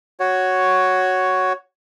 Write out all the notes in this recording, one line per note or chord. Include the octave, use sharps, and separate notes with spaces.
F#4 C#5